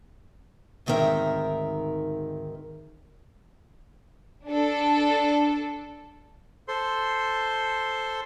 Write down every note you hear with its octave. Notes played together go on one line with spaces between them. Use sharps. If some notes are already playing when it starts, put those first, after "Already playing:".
D2 G#2 D#3 C4 A#4 E5
D4 A4
A4 C5 C6